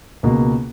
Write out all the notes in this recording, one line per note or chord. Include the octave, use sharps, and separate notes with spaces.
C#2 B2 A#3